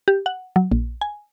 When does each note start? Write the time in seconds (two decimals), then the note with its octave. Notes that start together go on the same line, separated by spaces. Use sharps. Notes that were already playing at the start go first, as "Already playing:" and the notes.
0.08 G4
0.26 F#5
0.56 F#3
0.72 A#1
1.01 G#5